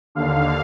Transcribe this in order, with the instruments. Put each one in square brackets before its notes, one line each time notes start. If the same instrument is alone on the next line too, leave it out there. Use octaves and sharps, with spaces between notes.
[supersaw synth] D#2 D3 F5